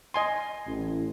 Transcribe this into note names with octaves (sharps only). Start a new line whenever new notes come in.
D#5 G#5 C6
A1